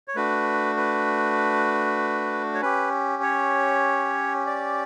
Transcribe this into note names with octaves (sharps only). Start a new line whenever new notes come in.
C#5
A3 D4 F#4 B4
B4
C#5
C#4 G4 B4
C#5
D5